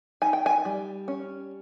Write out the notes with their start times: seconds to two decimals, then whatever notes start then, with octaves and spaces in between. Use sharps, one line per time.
0.22 D#4 G#5
0.33 G5
0.46 G#5
0.65 G3
1.08 C#4